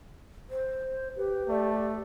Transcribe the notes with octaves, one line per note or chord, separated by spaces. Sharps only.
C5
G4 B4
A3 D5